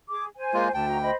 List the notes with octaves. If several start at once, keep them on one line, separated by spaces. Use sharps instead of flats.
G#4 D6
C5 G#5
G#3 A#3 F4
D2 G5 A5
F#4 D#5 A#5
C5 D#5 B5